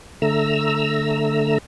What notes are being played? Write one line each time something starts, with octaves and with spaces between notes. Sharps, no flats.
D3 A3 A#5 E6